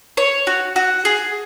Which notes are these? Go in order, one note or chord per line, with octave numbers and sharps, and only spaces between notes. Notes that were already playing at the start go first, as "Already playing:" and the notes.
C#5
F#4
F#4
G#4